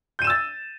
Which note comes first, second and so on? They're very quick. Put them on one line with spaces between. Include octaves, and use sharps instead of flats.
G6 D#7 E7 E6 A6